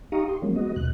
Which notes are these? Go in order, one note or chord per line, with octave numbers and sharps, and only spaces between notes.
D#4 G4 F5 A#5 C#6 D#6
G4 C6
F3 F#3 G#3 A#3 C#4
G#3 B3 F#4 D#5
D#2 B2 F#6